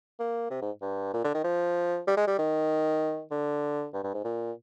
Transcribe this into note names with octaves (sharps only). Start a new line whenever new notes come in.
A#3
C3
G#2
G2
A#2
D3
D#3
F3
G3
G#3
G3
D#3
D3
G2
G2
G#2
A#2